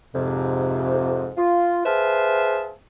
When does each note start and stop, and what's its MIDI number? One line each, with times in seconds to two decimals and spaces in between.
0.14 1.31 41
0.14 1.31 44
0.14 1.31 48
1.37 1.81 65
1.85 2.72 68
1.85 2.72 71
1.85 2.72 72
1.85 2.72 76
1.85 2.72 77
1.85 2.72 81